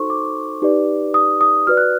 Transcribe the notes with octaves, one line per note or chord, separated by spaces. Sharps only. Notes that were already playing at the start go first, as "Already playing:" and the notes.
Already playing: D#4 F#4 A4 C5 C6 C#6
D6
D#4 G4 B4 D5
D#6
D#6
F#4 B4 D5 F6
F#6